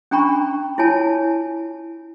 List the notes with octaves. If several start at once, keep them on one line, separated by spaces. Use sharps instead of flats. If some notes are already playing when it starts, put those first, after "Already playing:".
C#4 D4 G5 A#5 B5 C#6
E4 F4 C#5 G#5 A5